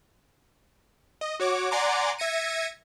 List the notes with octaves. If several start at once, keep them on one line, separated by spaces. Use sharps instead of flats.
D#5
F#4 C#5 D6
D5 F#5 G#5 A#5 C6 D6
E5 G#6 A#6 C#7 D#7